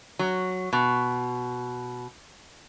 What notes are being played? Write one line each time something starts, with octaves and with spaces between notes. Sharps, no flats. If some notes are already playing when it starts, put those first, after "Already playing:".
F#3
B2